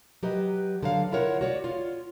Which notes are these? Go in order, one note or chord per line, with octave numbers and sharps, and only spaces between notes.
F#3 G4 B4 D#5
D3 F#3 F5
E4 F4 A#4 C#5 F#5
F#4 C#5 D5
F4 C#5